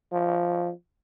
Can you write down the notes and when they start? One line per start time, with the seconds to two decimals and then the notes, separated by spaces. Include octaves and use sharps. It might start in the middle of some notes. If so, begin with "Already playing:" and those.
0.12 F3